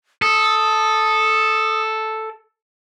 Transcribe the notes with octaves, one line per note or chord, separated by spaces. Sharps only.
A4 D#6